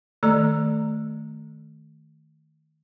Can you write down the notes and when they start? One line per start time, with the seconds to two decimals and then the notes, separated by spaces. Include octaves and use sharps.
0.23 D#3 A3 A4 D5 A#5